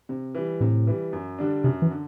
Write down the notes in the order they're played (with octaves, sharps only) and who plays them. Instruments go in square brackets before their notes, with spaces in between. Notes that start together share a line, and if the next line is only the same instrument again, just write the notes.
[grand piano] C3
E3 G3
[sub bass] A2 [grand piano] C3
[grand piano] E3 G3
F#2
D3 G3 D4
[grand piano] F#2 [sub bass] C3
[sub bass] E3
[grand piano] D3